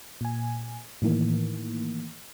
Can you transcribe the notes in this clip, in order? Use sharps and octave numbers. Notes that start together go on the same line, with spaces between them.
A#2 G#5
A2 D#3 E3 A#3